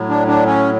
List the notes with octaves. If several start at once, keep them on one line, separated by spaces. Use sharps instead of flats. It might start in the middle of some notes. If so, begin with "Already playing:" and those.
Already playing: A2 F#3
D4
D4
C#4